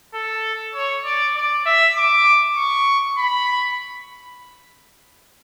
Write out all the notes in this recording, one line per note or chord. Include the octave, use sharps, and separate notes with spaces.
A4
C#5
D5
D5
E5
D6
C#6
B5